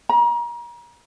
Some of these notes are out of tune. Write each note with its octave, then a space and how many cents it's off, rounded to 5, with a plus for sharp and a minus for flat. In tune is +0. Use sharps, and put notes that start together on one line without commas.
A#5 +35